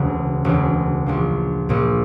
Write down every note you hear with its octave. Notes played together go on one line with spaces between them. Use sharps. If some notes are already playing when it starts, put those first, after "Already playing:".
Already playing: E1 D2 C#3
E1 D2 C#3
A#1 A#2 F3
A#1 A#2 F3